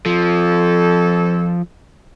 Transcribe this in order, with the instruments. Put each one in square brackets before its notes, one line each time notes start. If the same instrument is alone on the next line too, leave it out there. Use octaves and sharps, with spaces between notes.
[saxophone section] F2 A4 [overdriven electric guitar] F3